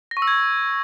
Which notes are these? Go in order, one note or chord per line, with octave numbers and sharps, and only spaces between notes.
A#6
C#6
E6
G#6